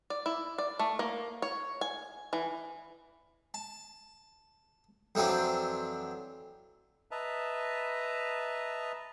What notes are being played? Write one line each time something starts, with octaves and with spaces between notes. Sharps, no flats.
D5
E4
D5
A3
A#3
C#5
G#5
E3
A5
F2 E3 F#3 C4 D4
B4 D#5 E5 A5 A#5